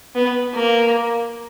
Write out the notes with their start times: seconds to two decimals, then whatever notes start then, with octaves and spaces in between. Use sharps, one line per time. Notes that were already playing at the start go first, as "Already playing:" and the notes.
0.15 B3
0.54 A#3